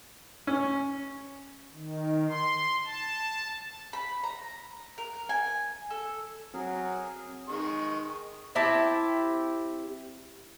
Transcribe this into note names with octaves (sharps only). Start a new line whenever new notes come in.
C#4
D#3
C6
A5
B5
A#5
A#4
G#5
A4
F#3 C4 G#4 A#4
D#3 G#3 C#6
C4 E4 G4 A5